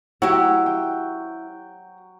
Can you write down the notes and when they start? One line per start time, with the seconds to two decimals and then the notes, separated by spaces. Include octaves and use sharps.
0.22 F#3 E4 F#4 G4
0.66 G5